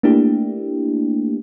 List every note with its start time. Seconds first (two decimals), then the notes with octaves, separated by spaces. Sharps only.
0.03 A3 A#3 D4 E4 G4